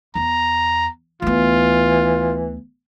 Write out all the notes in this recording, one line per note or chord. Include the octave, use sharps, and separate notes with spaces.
E2 A#5
D2 E3 B3 F4